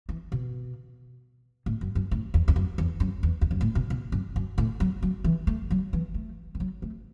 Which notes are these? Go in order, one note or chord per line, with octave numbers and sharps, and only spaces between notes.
E3
B2
A2
F#2
F#2
A2
E2
E2
F#2
E2
F#2
E2
E2
F#2
A2
B2
B2
F#2
F#2
A2
F#3
F#3
E3
A3
F#3
E3
A3
E3
F#3
A3